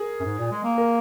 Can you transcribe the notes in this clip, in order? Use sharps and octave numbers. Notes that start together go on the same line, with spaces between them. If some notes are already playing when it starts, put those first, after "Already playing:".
Already playing: G#4 A#4
F#2
G#2
A#2
G#3
A#3
A#4